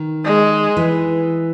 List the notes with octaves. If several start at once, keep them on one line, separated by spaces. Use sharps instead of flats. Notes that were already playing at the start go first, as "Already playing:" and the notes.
Already playing: D#3
G#3
E3